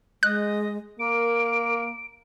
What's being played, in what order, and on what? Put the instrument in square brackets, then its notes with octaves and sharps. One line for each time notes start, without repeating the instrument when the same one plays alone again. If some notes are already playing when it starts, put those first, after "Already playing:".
[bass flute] G#3 [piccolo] D#5 [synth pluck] F#6
[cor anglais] A#3 [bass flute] A#4 [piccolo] D7